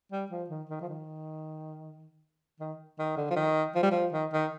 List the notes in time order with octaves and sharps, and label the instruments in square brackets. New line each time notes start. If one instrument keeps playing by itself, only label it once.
[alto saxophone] G3
F3
D#3
D#3
F3
D#3
D#3
D#3
D3
F3
D#3
F3
G3
F3
D#3
D#3